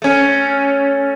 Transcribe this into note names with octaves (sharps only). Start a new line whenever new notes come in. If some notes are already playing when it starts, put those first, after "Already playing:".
A3 C#4